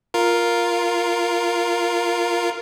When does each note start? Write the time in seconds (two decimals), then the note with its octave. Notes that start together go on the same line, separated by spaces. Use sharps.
0.14 F4 A#4